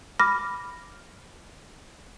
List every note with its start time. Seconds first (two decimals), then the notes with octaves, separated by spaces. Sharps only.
0.20 B5 D6 F6 A#6